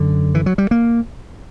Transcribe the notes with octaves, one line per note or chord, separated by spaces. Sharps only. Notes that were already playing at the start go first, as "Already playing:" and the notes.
Already playing: F#2 D3
E3
F#3
G3
A#3